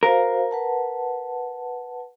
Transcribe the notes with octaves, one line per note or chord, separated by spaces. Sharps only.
F#4 A#4 C5 F5
B4 F#5 A5